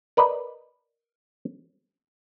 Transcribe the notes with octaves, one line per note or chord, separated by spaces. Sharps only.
A#4 B4 D5 D#5